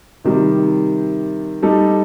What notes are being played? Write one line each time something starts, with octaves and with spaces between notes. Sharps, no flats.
C3 D#3 G3
G3 D#4 A4